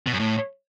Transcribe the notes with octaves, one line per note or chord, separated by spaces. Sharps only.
B2
F#2
A2